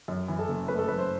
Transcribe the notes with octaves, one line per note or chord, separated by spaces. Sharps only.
F#2
E3
A4
F#1
A3 B4
A4
F#2 B4
C5